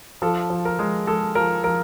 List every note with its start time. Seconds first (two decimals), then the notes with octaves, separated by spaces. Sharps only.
0.22 F3 A4
0.50 F3
0.65 A#4
0.79 G#3
1.07 G#3 A4
1.35 F3 A#4
1.64 F3 A#4